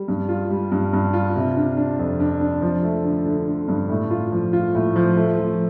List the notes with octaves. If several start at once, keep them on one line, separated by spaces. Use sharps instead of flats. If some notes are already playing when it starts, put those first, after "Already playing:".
Already playing: G3
G2
F4
G3
G2
G2
F4
C3
D4
D4
F2
D4
D4
F3
A3
D3
D3
D3
G2
A2
F4
F3
F4
A2
F3
A3
F3